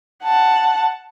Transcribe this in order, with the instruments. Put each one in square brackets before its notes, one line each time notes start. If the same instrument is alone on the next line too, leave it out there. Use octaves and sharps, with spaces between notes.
[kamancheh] F#5 A5